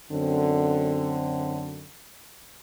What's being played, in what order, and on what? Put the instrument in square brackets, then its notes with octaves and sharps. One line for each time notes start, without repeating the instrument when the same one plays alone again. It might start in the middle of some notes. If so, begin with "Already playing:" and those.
[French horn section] F#2 D3 C4